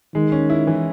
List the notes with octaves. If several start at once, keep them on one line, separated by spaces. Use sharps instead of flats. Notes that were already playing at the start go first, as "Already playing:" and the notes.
D#3 G#3
C#4
E4
E3